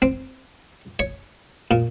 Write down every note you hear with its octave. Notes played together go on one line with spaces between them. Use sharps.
C4
C#5
A#2